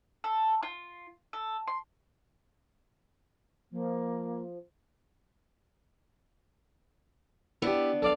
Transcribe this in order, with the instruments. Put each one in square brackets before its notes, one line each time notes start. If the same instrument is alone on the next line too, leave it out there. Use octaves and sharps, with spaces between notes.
[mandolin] A4
F4
A4
C6
[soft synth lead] F3 [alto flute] A#3
[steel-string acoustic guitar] B3 D4 [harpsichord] E4 G4
[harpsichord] A4 D5 F5